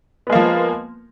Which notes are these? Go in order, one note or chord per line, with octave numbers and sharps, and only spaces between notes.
F3 G#3 A#3 B3